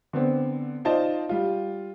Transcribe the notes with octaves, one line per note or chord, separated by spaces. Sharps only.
D3 B3 C4
D#4 F4 C5 D5 D#5 A5
G3 F4